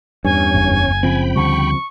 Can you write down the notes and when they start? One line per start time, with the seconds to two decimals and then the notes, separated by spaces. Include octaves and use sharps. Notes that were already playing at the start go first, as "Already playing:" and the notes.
0.25 E2 G2 C#4 C#5 G#5
0.54 F#1
1.03 C#3 F3 C4 G5 B5
1.36 D2 D3 G3 C#6